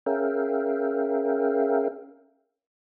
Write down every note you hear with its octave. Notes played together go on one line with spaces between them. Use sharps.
C#4 G#4 A#4 E5 F5 G5